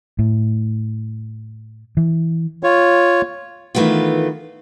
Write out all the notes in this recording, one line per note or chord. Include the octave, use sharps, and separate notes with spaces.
A2
E3
F4 C#5
D#3 E3 A3 B3 F4